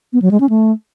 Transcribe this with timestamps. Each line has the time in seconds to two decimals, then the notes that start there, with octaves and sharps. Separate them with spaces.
0.13 B3
0.22 F#3
0.31 G#3
0.40 C#4
0.49 A3